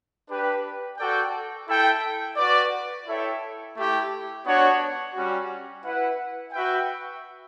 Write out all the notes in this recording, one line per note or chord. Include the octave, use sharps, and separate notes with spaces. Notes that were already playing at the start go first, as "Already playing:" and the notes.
D4 G4 B4
F#4 A4 D5 G5
E4 A4 E5 G5
F#4 B4 D5
E4 A4 C#5 E5 G5
A3 E4 G4
B3 D4 F#4 C#5 F#5
G3 C#4 F#4
E4 B4 F#5
F#4 B4 E5 G5